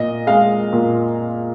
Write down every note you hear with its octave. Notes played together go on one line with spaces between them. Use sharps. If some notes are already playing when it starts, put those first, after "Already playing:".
Already playing: A#2 D#5
G#3 F5
A#2